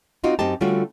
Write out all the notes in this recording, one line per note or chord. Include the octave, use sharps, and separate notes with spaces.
C4 D#4 F4 F#4
F#2 C4 D#4 G4 A5
D3 G3 A3 C#4 F4 F#4